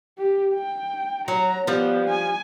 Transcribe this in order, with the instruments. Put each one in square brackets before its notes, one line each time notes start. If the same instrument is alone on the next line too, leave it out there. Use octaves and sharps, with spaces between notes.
[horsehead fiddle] G4
G5
[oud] F#3 [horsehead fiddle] A#5
[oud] F3 G3 [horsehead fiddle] B3
[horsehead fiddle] G#5